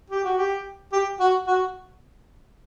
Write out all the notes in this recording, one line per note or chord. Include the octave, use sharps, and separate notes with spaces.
G4
F#4
G4
G4
F#4
F#4